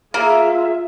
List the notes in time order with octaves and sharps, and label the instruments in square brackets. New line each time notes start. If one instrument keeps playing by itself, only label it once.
[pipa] A#3 [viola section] F4 G#4 E5